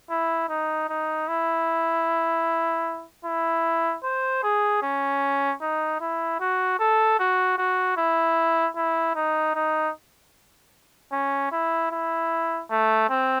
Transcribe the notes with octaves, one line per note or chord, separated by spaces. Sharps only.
E4
D#4
D#4
E4
E4
C5
G#4
C#4
D#4
E4
F#4
A4
F#4
F#4
E4
E4
D#4
D#4
C#4
E4
E4
A3
C4